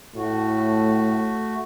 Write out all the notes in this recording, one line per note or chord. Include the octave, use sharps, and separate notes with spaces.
A2 A3 F#4